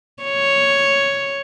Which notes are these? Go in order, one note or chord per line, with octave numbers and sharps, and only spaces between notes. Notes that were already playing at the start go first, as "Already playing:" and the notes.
C#5